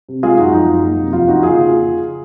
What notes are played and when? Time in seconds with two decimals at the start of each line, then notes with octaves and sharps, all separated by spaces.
0.09 C3
0.23 G#3 F4 G#4
0.38 F#2 D#4 F#4
0.53 F3 D#4
0.68 F#2
0.84 A#3
0.98 C3
1.13 F2 F4
1.28 A#3 D#4 F#4
1.43 C#3 F4 G#4
1.58 C#3